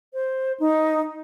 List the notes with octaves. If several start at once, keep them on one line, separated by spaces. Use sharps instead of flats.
C5
D#4